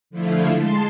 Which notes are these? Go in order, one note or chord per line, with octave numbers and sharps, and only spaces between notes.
D3 F3 A3 E4 F4
G#3 A5 C6